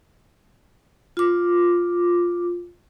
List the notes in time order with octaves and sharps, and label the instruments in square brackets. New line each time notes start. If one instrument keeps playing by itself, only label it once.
[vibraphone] F4 D6